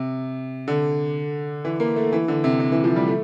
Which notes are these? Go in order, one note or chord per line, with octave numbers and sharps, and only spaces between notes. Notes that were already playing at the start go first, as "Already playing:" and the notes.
Already playing: C3
D3
E3
A#3
A3
E3
D3
C3
C3
E3
F3
G3
A3